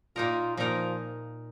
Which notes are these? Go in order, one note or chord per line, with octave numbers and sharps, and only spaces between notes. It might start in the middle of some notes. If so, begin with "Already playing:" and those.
A#2 A#3 D#4 F4 A#4
A#2 F3 A#3 D#4 A#4